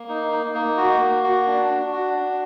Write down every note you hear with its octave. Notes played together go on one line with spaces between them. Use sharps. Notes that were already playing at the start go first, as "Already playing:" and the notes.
Already playing: A#3
D#4
D#4
A#3
F#4
A#3
F#4
D4
D4
F#4
D4